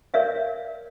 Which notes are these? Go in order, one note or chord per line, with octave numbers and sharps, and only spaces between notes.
A#4 C#5 D5 E5 F5